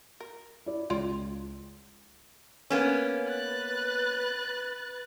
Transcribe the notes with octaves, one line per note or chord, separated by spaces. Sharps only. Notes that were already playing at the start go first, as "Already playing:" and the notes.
A#4
E4 D5
C#2 F4 C#5 D5
A#3 B3 C#4
B4 F#6 A6